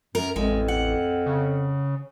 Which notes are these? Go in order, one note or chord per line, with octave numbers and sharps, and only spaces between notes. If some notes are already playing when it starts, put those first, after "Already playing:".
F#2 A#4
A1 F2 G#3
F#5
C#3